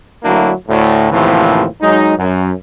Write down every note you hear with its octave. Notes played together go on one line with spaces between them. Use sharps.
D2 F#3 A#3 D4 E4
D2 A2
D#2 A2 C3 E3 F3
F#3 G#3 D#4
F#2